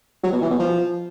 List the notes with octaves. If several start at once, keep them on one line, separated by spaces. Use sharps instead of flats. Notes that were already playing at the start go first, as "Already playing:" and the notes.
F#3
B2
E3
B2
F3